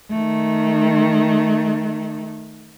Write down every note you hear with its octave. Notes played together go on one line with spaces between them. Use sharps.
D#3 A3